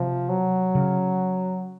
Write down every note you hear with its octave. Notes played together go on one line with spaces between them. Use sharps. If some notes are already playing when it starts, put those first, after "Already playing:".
Already playing: C3 F3
F#3
C#3